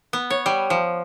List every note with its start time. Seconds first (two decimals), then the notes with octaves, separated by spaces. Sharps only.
0.13 B3
0.30 C#5
0.46 G3
0.70 F3